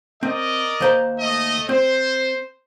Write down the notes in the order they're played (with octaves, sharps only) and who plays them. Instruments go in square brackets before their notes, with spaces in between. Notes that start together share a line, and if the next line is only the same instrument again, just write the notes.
[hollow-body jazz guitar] C4 [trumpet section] A#4 D5 D#5
[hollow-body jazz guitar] D#2 C5 A#5
[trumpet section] A3 D#5
[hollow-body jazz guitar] C4 [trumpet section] C5